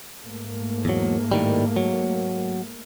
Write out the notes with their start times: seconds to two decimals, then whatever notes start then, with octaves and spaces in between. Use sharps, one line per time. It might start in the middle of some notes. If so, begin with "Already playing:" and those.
0.22 G#2 A3 A#3
0.85 E2 F#3
1.32 A2 D#3 G3
1.76 F#3